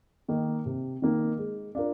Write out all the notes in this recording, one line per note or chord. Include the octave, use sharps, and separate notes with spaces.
D#3 A#3 D#4
C3
D#3 A#3 D#4
G#3
D4 F4 A#4